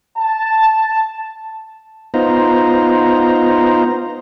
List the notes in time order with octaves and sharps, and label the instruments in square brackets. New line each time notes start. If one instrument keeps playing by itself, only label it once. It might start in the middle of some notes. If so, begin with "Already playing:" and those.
[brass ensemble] A5
[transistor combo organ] B3 D#4 F4 C5 A#5